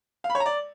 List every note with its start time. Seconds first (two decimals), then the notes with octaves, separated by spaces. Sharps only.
0.24 F5
0.30 B5
0.35 C#5
0.40 A#5
0.46 D5